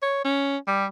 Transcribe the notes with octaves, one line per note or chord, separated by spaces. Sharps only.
C#5
C#4
G3